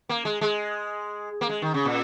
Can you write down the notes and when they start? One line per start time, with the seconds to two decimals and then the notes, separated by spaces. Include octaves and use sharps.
0.09 A#3
0.25 G#3
0.41 G#3
1.41 A#3
1.49 G#3
1.62 D#3
1.74 C#3
1.85 A#2